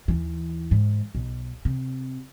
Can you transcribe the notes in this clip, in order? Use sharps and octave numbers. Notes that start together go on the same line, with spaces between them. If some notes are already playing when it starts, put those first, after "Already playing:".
D#2 E3
G#2
B1
C3